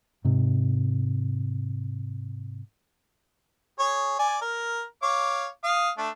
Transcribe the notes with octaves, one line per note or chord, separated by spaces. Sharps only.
G#2 C3
G#4 C#5
D5 G#5
A#4
C#5 F5 D6
F5 D#6
A3 D4